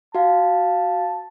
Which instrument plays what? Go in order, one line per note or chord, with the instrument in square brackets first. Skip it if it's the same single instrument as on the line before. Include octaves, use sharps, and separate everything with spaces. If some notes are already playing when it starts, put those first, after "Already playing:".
[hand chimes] F#4 F5 [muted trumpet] A5